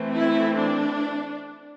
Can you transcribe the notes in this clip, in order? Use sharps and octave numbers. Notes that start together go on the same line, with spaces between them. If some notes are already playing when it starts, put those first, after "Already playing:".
Already playing: E3 A3 C4
E4
D4